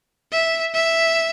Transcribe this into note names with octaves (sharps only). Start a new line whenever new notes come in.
E5
E5